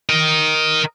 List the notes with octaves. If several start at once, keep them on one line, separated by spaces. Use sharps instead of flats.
A#4 D#5